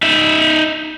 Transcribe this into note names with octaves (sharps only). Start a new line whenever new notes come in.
D#4 E5